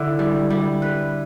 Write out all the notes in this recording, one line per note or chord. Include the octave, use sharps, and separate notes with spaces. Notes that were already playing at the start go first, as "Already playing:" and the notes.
Already playing: D3 E4
G3
G3
B4